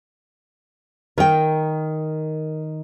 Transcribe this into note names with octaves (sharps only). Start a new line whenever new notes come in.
D#3 A#4 G5